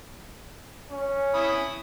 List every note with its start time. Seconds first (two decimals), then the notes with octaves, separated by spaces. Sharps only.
0.90 C#4
1.34 E4 B5 D#6